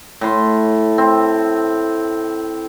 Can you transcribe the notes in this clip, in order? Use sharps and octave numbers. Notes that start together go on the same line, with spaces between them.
A2 C6
C4